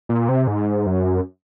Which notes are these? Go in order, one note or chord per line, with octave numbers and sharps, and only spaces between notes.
A#2
C3
G#2
F#2